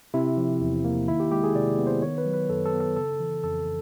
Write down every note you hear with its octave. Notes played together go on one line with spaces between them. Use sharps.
C3 E4
F3
E2
A#3
D#3 E4
G4
G#3 G4
G#4
C3 D5
B3
C5
D#3 C#5
B4
F#3
B4
F#2 A4
A4
B3
A4
C#3 A4
E3
F2 A4